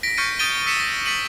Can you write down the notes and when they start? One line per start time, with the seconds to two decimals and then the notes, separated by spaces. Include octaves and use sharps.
0.03 A#6 B6 D7
0.17 C#6 F6 G6 A6 C#7 D#7
0.39 D#6 G6 A6 D7 D#7 G7
0.66 E6 B6 C#7 E7
0.80 A#6
1.06 A6 B6 C#7 D#7 F#7